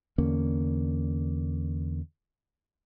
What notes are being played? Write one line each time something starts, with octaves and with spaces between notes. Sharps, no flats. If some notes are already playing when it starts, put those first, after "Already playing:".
E2 D3 A#3 C#4